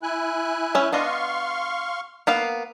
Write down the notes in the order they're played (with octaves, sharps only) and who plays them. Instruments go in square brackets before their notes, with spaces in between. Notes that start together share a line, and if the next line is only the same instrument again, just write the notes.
[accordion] E4 G#5 F#6
[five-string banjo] C#4 E5
[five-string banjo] B3 D4 D#5 [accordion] F5 C6 C#6
[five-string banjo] A#3 B3 F5